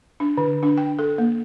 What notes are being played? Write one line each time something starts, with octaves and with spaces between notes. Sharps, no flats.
D4
D3
D4
G5
A4
A#3